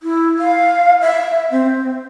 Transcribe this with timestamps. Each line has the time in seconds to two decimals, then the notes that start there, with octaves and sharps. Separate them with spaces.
0.03 E4
0.38 F5
1.01 E5
1.51 C4